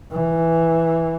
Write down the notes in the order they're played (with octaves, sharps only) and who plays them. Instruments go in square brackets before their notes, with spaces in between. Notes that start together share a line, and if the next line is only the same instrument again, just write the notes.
[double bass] E3